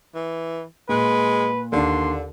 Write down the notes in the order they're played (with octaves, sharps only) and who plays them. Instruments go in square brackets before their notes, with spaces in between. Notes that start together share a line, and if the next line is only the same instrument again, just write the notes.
[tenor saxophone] E3
[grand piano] A#2 [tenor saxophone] G#3 [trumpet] B4
[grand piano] D#2 D4 [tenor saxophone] D3 [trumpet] C6